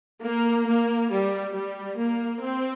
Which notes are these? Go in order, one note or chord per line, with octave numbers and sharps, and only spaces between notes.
A#3
A#3
G3
G3
A#3
C4